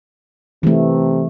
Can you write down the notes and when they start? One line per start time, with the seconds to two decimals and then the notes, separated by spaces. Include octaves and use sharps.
0.63 C3 E3 A3